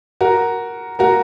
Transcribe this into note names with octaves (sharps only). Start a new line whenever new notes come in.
F#4 A#4
F#4 A#4